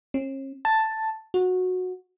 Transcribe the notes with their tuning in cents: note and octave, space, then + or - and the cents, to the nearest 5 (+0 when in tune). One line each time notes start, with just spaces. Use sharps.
C#4 -45
A5 +5
F#4 -15